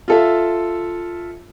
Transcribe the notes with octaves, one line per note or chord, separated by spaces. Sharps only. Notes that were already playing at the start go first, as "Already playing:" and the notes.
F4 A4 E5